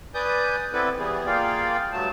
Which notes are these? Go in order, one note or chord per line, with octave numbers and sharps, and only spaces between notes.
B4 D5 G#5 D#6 G6
B3 C4 E4 A4 B4 D5
E3 G3 B3 G#4
A#3 F4 G#4 D5 F5 G5
G2 F#3 A3 A5